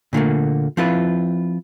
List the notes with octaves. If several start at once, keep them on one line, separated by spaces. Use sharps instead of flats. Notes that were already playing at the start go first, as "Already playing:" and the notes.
A#2 D3 A3 A#3
F3 C4 E4 F4 B4